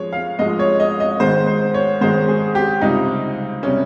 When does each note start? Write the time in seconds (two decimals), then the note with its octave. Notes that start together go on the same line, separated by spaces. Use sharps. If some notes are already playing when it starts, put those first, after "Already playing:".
Already playing: F3 G#3 C#5
0.13 F5
0.39 G#2 F3 G#3 D#5
0.59 C#5
0.80 D#5
1.00 D#5
1.20 G#2 D#3 G#3 C5
1.47 C5
1.74 C#5
2.01 G#2 D#3 G#3 C5
2.28 G#4
2.55 G4
2.81 C#2 C3 G3 D#4
3.63 C3 G3 C#4